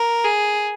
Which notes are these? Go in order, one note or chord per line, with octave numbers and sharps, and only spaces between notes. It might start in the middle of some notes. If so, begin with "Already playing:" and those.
Already playing: A#4
G#4